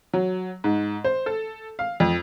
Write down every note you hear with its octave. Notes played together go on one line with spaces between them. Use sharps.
F#3
G#2
C5
A4
F5
F2